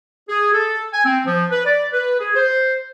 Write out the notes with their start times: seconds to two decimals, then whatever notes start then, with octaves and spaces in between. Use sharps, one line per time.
0.29 G#4
0.53 A4
0.93 G#5
1.05 C4
1.24 F3
1.51 B4
1.66 D5
1.93 B4
2.19 G#4
2.35 C5